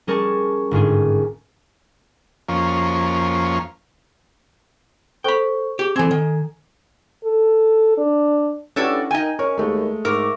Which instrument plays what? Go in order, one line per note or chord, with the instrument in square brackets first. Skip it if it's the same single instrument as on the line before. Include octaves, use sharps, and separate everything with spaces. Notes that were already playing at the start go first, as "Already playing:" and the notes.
[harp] G3 C#4 G#4 A#4 A5 C#6
G1 G#2 F4 G#4
[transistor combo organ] F2 F3 A#3 C#4
[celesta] A4 C5 C#6 [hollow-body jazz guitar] G5 B5
[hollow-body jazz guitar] G4 [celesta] G#4
[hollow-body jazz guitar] E3 C4 [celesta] A4 G#5 G#6
[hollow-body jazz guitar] D#3
[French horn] A4
D4
[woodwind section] G2 G3 [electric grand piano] C#4 E4 F#4 [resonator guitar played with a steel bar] D4 A4 C#5
[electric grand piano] D#4 G5 [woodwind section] A#4 [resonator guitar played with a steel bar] D#5 G#5
[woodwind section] C#4 [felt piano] A#4 [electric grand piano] C#6
[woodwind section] D#2 [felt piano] G#3 A3
[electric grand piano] G#2 [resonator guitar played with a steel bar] A#4 [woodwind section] E5 C#6 D6